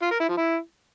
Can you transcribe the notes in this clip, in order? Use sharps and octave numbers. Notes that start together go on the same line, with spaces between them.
F4
A#4
E4
F3
E4